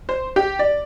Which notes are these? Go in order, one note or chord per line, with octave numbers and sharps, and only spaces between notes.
C5
G4
D5